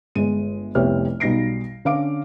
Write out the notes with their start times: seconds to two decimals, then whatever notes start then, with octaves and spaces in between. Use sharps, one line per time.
0.15 G1 G#3 D#7
0.75 F1 C2 B3 G4 C#5 F6
1.20 B1 G3 D#4 A#6 C7 D7
1.85 D3 C#4 F5 D6 D7